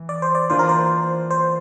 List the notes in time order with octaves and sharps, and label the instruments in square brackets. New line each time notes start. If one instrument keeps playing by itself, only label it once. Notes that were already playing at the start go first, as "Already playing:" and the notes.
Already playing: [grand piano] E3
[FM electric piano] D5
C5
D5
[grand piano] E3 A#3 D4 F4 [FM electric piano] C5
[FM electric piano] A#4
C5
C5